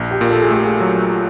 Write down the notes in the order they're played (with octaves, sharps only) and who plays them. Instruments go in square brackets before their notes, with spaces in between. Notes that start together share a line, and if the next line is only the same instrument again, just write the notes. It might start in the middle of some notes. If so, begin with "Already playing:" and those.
Already playing: [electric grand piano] A#1
[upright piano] G4
[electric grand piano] A#2
[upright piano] A4
G#4
[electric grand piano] A3 [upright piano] G4
[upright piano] G#4
[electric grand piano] F#3